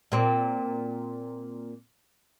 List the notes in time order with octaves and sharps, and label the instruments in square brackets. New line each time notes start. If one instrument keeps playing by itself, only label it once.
[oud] A#2 C4